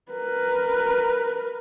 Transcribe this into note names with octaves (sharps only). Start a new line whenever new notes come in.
A#4 B4